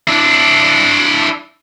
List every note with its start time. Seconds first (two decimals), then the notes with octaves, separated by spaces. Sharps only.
0.07 D4 E4